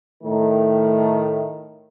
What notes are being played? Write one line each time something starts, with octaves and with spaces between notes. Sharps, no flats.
A2 D#3 A3